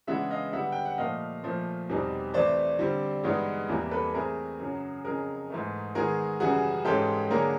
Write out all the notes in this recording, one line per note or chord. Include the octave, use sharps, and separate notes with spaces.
C#3 E3 G#3 B3 D4 E5 F#5
D#5 F5
D3 G3 B3 D4 E5 F#5
G5
F#5
A#2 F3 A3 D#5 F5
A#2 F3 A3
E2 B2 G3 C4 D#4
C3 E3 A3 C5 D5
D3 G3 C4
G2 E3 G#3 B3 D#4
E2 C3 E3 G3 A#3
A4 B4
C3 E3 A3 C4 G#4 A#4
F#2 C#3 F#3
F2 C#3 F#3 G#4 A#4
G#2 E3 A3
D#3 G#3 B3 G#4 A#4
F#2 C#3 E3 G3 F#4 G#4
G#2 E3 G#3 C#4 G4 A4
D3 F#3 A#3 D4 G#4 A#4